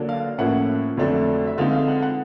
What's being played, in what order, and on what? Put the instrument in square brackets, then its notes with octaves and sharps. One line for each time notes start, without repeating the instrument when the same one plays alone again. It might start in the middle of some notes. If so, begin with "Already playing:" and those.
Already playing: [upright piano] D3 F#3 A#3 D4
F5
A2 F3 A#3 C#4 E4 F#5
F2 D3 F#3 A3 D4
E5
D3 F3 G#3 C4 D#4 F5
F5
F#5
F#5